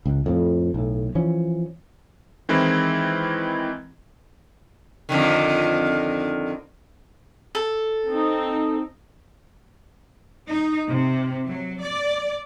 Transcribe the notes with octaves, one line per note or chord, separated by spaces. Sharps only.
C#2
F2 A2 F3
B1 A2
E3 F3 C#4
D#3 E3 G#3 C4 E4
F2 D3 D#3
A4
C4 D#4
D#4
C3
F#3
D5